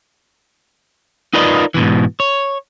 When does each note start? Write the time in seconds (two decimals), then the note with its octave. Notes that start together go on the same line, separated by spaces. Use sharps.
1.33 D#4 F4 A#4 B4 D5 D#5
1.74 G#2 B2 E3
2.20 C#5